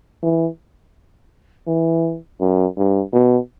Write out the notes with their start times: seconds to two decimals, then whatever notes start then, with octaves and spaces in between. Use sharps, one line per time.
0.23 E3
1.67 E3
2.41 F#2
2.77 G2
3.12 B2